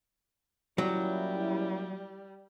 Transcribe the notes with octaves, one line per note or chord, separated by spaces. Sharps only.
A#2 F#3 G3 C#4 E4